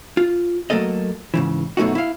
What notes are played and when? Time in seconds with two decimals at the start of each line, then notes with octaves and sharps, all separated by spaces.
0.17 F4
0.70 F#3 A3 A#3 A4 D#5
1.34 G#2 C#3 E3
1.77 F#2 B2 A3 D#4 F#4
1.95 E4 F5